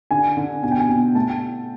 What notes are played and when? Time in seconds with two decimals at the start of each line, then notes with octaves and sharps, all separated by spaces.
0.11 D3 G#5
0.37 D3
0.63 B2 G#5
0.71 G5
0.80 G#5
0.89 B2
1.15 A3 A5
1.29 G5